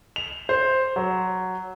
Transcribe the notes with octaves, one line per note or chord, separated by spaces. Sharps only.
F7
C5
F#3